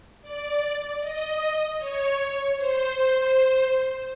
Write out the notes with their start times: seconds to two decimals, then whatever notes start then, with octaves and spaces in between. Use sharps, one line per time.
0.22 D5
1.00 D#5
1.78 C#5
2.56 C5